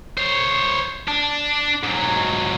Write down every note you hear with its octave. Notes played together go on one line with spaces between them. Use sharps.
C5 C#5
D4
G#2 F#3